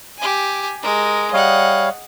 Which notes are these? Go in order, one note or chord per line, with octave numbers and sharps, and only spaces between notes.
G4 G#5
G#3 A#4
G3 C#5 D#5 F5 F#5